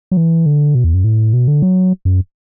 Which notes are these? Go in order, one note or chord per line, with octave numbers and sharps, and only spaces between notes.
F#3
E3
D3
B2
E2
F#2
A2
B2
D3
F#3
F#2